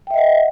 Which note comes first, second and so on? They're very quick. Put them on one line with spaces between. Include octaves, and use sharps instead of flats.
G5 E5 D#5 F#5